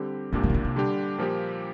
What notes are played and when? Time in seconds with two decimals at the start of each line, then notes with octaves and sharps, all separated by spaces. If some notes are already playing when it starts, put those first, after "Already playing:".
Already playing: D3 G3 C4 G4
0.32 C2 G2 A#2 A#3 D4 G4
0.43 D3
0.50 C3
0.54 D3
0.64 C3
0.76 D3 G3 D4 G4
1.18 A#2 F3 A#3 G4